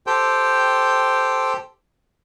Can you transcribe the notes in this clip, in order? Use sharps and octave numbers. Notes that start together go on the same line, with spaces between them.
G4 A4 C5 G5